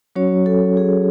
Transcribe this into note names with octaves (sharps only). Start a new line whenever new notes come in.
F#3 C#4 F#4 C#5
A4
G#4